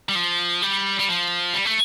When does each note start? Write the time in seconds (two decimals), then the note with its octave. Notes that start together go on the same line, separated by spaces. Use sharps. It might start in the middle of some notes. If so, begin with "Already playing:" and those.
0.09 G3
0.15 F3
0.62 G3
0.99 G3
1.08 F3
1.54 G3
1.65 A3